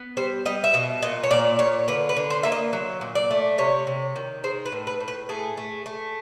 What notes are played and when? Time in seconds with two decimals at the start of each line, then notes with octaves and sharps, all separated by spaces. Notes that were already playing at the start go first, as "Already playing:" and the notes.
Already playing: B3
0.17 G3 C5
0.45 G3 D#5
0.64 E5
0.74 B2 D#5
1.02 A#2 D#5
1.23 C#5
1.31 A#2 D5
1.59 A#2 C#5
1.88 D3 B4
2.09 B4
2.17 D3
2.30 C5
2.43 A#3 E5
2.52 D#5
2.73 F#3
3.01 A#2
3.15 D5
3.31 A3
3.58 C3 C#5
3.87 C3
4.16 D#3
4.44 G#3 C5
4.66 B4
4.72 A2
4.87 B4
5.00 A2
5.08 B4
5.29 A3 G#4
5.57 A3
5.86 A3